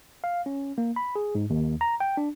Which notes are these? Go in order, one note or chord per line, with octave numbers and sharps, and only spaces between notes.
F5
C#4
A#3
B5
G#4
G#2
D#2
A#5
G5
D4